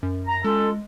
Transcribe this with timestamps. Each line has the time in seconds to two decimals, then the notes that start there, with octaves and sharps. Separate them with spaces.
0.03 F#2
0.26 A#5
0.44 G#3 C#4 F4 A4